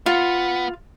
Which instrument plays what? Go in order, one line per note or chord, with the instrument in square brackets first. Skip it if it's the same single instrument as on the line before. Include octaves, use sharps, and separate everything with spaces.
[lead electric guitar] B3 [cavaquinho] F4